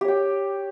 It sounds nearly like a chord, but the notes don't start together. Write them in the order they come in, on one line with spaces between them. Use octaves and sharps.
G4 C#5 G5